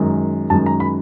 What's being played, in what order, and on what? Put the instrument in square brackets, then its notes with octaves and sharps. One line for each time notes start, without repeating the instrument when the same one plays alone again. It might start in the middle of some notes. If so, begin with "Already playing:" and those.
Already playing: [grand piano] F#2 D#3 G#3
F#2 D#3 G#3 A5
A#5
B5